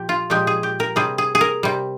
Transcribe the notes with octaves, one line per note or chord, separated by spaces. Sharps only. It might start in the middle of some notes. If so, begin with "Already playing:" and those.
Already playing: A#2 F3 G4
F4
A#2 F3 G#3 G4
G#4
G4
A#4
C3 G3 G#4
G#4
G#4
A#4
C3 G3